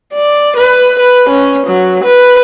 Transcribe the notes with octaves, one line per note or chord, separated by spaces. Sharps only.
D5
B4
B4
C#4
F#3
B4